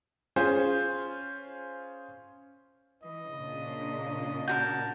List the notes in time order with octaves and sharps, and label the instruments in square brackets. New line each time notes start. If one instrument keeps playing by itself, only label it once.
[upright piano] C#4 F4 G#4 C5
[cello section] E3 [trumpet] D#5
[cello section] A#2 C#3 D4
[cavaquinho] F#4 G4 A#4 [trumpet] A5 [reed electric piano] G6